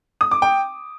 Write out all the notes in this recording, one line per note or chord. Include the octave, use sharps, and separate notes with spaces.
D#6
D6
G5